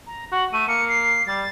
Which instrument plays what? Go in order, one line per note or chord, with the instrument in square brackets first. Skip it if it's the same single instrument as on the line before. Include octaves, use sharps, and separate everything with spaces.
[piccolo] A#5
[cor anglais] F#4 [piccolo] F#5
[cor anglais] A3 [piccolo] D#7
[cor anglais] A#3 [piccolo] C#7
[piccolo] C7
[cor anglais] G3 [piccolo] A6